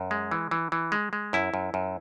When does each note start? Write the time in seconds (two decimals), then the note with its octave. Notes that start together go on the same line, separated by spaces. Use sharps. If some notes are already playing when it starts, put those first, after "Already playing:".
Already playing: F#2
0.11 G#3
0.31 E3
0.51 E3
0.72 E3
0.92 G#3
1.13 G#3
1.33 F#2 E4
1.54 F#2
1.74 F#2